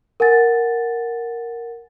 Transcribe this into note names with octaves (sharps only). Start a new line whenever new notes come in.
A#4 F#5 G#5 A6